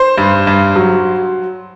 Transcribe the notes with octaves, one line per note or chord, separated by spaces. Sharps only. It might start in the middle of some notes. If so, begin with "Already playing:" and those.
Already playing: C5
G2
G2
F#3